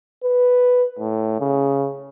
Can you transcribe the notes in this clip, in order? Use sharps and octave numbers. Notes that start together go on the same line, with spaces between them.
B4
A2
C#3